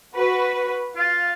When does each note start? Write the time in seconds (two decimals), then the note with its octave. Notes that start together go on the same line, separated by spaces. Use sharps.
0.15 F#4 B4
0.96 F4 F5